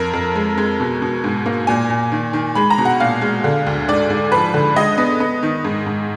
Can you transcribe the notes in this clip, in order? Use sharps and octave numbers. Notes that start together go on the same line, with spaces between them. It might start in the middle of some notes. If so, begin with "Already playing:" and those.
Already playing: F2 A#4
F2
G#3
G#3
B2
B2
G#2
A#3
A#2 G#5
A#2
D#3
D#3
G#3 B5
A#5
B2
F#5
A#2 F5
G#3
D3
D2
G#2 D5
G#2
F3 B4
D3
G#3 D#5
B3
B3
D#3
G#2
G#2